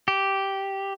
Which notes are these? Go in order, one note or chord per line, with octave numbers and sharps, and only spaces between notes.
G4